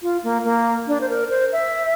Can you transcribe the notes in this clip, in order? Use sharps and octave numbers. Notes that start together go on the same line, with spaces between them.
F4
A#3
A#3
D4
C5
A#4
C5
E5